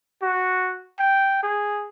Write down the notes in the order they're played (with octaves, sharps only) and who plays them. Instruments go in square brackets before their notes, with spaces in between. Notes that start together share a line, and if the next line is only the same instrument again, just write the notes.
[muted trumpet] F#4
G5
G#4